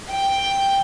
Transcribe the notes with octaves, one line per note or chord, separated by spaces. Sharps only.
G5